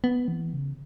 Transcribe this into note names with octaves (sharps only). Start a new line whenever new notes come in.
B3
E3
C#3